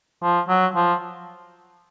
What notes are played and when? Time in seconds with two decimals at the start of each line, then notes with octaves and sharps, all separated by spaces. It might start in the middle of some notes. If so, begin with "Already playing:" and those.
0.23 F3
0.49 F#3
0.76 F3